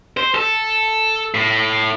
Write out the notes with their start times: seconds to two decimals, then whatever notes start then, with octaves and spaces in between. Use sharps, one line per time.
0.17 C5
0.35 A4
1.34 A2